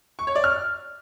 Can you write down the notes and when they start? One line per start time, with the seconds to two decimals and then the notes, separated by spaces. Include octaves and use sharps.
0.19 C#6
0.27 C#5
0.35 D5
0.44 F6